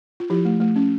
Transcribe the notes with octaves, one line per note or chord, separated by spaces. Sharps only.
F4
F3 E4 G4
A3
A3
C#4